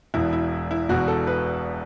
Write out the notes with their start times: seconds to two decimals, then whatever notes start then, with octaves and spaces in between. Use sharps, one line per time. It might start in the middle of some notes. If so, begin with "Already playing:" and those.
0.14 E1 E2 B2 E4
0.33 E4
0.71 E4
0.89 E1 E2 B2 F#4
1.08 A4
1.27 B4